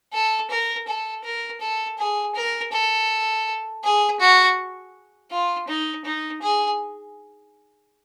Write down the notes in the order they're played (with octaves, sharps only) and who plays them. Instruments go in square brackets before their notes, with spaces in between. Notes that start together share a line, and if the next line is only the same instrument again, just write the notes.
[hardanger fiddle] A4
A#4
A4
A#4
A4
G#4
A#4
A4
G#4
F#4
F4
D#4
D#4
G#4